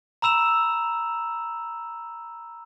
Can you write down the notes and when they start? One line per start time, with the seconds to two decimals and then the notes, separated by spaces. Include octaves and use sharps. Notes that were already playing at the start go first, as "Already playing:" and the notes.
0.22 A#5 B5 E6 E7 F7